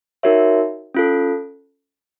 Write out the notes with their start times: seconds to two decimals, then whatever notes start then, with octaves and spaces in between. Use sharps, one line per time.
0.23 D#4 F#4 A#4 C#5 E5
0.95 C#4 F4 A4